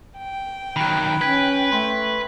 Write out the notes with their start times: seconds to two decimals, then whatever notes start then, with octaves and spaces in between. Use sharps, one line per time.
0.18 G5
0.76 D#3 F#3 B5 F#6
1.21 C#4 B4 G#6
1.72 A3 C6